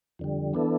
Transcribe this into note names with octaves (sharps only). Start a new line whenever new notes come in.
F2 D3 G3
E3 B3 D4 A4